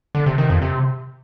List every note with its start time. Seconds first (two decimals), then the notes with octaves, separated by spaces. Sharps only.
0.15 D3
0.26 C3
0.38 D#3
0.50 F2
0.62 C3